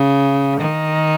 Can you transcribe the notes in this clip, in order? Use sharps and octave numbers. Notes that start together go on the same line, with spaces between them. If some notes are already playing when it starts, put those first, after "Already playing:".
Already playing: C#3
D#3